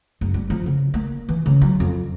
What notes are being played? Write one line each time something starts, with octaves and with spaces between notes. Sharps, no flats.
F#1
G3
F3
C#3
A#3
E3
C#3
F#3
F2